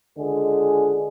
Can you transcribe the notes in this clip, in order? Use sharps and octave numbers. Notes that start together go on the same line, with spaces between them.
C#2 D3 G#3 G#4